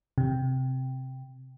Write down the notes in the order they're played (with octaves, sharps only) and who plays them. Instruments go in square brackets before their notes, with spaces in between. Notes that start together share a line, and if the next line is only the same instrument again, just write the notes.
[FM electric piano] C3